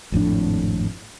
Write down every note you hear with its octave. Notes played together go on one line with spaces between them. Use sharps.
G#1 F2 A2 D4